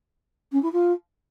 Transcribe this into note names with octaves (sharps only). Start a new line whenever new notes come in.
C#4
E4
F4